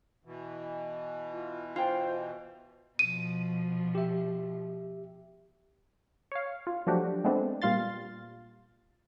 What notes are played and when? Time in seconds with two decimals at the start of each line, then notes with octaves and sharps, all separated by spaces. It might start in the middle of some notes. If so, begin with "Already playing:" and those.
0.25 B2 E3
1.32 F4
1.76 F4 C5 G5
2.99 B2 F3 D#7
3.95 G4 E5
6.32 C#5 F5
6.67 F4
6.87 F3 F#3 A3 D4 F#4 G4
7.24 G#3 A3 B3 C4 D4
7.62 A#2 G3 F4 F5 C6 A6